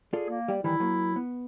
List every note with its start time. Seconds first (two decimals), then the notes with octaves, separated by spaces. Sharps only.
0.13 F4 G#4 A4 D5
0.29 A#3
0.48 G3 G4 D5
0.64 D#3 E3 G3 E4
0.80 F#3 A#3
1.16 B3